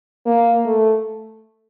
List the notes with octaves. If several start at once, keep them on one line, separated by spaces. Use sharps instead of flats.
A#3
A3